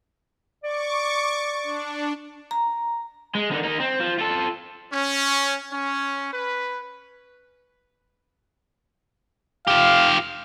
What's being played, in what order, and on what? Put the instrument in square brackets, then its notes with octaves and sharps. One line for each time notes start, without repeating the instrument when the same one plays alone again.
[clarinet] D5 [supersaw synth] C#6 D6
[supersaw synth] D4
[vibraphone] A#5
[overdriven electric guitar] G#3
D3 D#3
A#3 D#4
C4
F3
F4 A4
[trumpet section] C#4
C#4
B4
[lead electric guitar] F4 G4 [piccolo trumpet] F5